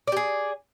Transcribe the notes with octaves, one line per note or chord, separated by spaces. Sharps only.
G4 G#4 D5